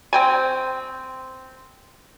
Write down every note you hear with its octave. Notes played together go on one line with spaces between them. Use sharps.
C4 G5 G#5